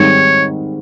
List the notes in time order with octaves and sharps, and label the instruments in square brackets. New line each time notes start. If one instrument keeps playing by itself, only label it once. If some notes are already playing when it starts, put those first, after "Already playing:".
Already playing: [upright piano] G#2 D#3 G3 C4 [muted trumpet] C#5